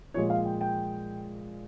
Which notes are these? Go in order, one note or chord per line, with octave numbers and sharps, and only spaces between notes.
A#2 F3 G#3 C#5
F5
G5
G5